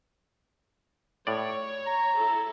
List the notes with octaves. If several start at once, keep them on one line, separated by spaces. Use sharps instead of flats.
A2 C#5 D5
A#5
E4 A4